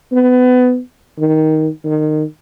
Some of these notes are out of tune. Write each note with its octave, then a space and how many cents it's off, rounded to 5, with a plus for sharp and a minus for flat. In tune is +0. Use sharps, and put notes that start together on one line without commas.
B3 +25
D#3 +10
D#3 -20